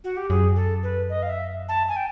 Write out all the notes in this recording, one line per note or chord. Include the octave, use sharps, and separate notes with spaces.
F#4
G4
F#2 G#4
A4
B4
D#5
F5
E5
A5
G#5
G5